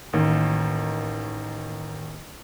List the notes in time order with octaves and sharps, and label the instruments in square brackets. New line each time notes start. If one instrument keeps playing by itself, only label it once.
[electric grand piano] A1 D#3 A#3